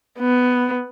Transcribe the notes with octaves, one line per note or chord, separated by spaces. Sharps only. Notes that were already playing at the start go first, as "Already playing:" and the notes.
B3